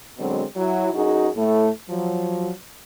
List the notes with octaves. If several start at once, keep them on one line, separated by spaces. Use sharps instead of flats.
B2 D3 F#3 G#3 C4
F#3 E4
F#2 D#4 F#4 G#4
A2 A3
F3 F#3